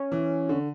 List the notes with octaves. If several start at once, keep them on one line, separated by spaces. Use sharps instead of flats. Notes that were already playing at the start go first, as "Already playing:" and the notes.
Already playing: C#4
E3
D3